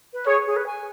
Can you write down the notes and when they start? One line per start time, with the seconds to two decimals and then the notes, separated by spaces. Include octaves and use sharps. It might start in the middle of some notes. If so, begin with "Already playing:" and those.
0.14 B4
0.27 G#4 C#5
0.46 G#4
0.56 B4
0.66 G#5